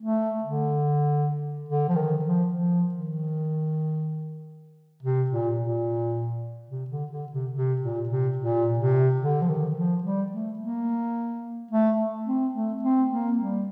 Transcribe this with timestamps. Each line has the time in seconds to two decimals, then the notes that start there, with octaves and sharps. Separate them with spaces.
0.02 A3
0.44 D3
1.69 D3
1.88 F3
1.96 D#3
2.25 F3
2.53 F3
2.94 D#3
5.03 C3
5.30 A#2
5.59 A#2
6.70 C3
6.90 D3
7.11 D3
7.32 C3
7.54 C3
7.81 A#2
8.09 C3
8.38 A#2
8.79 C3
9.20 D3
9.42 F3
9.49 D#3
9.76 F3
10.04 G3
10.32 A3
10.60 A#3
11.71 A3
12.27 C4
12.54 A3
12.83 C4
13.11 A#3
13.38 G3